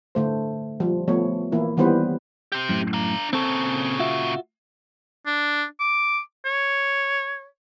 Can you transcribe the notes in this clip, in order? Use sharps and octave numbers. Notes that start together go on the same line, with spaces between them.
D3 A3 C5
F3 G3
F3 A3 B3 C#5
E3 A#3 E4
D#3 E3 G3 B3 B4 C5
C4 G4
F#2 A2
D4 A#5
A#2 C#3 C4 A4
F4 F#4 E5
D4
D6
C#5